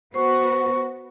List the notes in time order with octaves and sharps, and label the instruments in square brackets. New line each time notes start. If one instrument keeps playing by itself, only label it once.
[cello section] B3 F#4 [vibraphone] C5 C#6